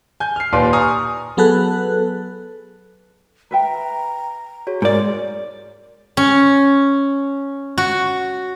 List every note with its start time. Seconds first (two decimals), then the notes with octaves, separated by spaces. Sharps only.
0.20 G#5 G6
0.36 F6 C7
0.53 D#2 A#2 G4 B4 D5 C6
0.73 G#5 A#5 C#6 D#6 F6
1.37 F#3 B3 G#4 A4 B4 F#6
3.51 B4 E5 G5 A#5
4.67 F#4 G#4 C#5
4.82 G#2 A#4 D5
6.17 C#4
7.78 F#4